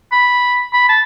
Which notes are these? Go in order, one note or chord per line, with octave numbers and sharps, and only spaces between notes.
B5
B5
A5